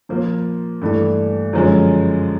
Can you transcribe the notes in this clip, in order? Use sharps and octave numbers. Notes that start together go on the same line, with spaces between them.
A#2 F3 A#3
G2 E3 A3 D4 G4
F#2 D3 F3 G#3